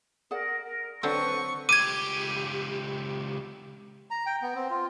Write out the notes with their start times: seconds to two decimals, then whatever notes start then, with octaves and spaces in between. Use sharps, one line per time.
0.31 G#4 A#4 D5 F#5
0.65 A#4
1.03 D3 F#3 C4 A4 B4 D5 C#6
1.69 C#2 G4 D6 G#6 D#7
4.11 A#5
4.26 G5
4.42 B3
4.55 C4
4.70 F4